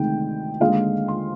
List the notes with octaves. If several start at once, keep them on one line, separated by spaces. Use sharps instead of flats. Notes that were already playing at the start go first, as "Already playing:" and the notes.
Already playing: D2 C3 D#3 G#3 D#4 G5
D#2 D3 G#3 F5
C6